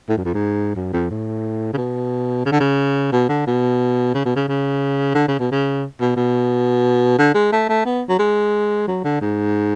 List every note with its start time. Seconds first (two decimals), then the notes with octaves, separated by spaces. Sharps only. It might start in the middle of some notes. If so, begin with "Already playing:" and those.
0.09 A2
0.17 F#2
0.25 F2
0.34 G#2
0.75 F#2
0.93 F2
1.10 A2
1.73 C#3
1.77 B2
2.45 C#3
2.52 D3
2.60 C#3
3.12 B2
3.29 D3
3.47 B2
4.14 C#3
4.25 B2
4.36 C#3
4.48 C#3
5.15 D3
5.28 C#3
5.39 B2
5.51 C#3
6.00 B2
6.16 B2
7.18 D3
7.34 G#3
7.52 A3
7.69 A3
7.85 B3
8.08 F#3
8.19 G#3
8.87 F#3
9.04 D3
9.21 G#2